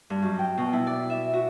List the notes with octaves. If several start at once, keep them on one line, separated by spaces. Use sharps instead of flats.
G2
F#2
G5
B2
E4
D5
E5
F#4